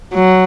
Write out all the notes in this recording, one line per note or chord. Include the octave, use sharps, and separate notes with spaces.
F#3